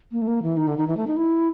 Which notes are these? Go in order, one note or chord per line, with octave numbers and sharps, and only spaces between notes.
A#3
A3
A#3
E3
D#3
D3
D#3
E3
A3
D#4
E4